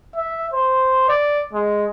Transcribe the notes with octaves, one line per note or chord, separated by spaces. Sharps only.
E5
C5
D5
G#3